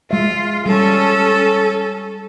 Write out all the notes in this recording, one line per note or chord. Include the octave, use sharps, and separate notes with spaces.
G#3 F4 E5
G3 C#4 A4